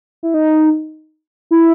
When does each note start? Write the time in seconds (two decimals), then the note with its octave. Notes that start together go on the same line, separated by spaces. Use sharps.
0.23 E4
0.34 D#4
1.51 E4